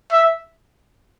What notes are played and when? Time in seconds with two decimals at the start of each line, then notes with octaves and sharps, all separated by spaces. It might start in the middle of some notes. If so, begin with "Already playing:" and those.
0.12 E5